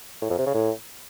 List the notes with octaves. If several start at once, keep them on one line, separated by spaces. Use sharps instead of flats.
A2
F2
C3
C#3
A2